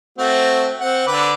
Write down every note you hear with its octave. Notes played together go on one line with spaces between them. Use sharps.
A3 C4 F#4
C4 F#5
D3 B4 D6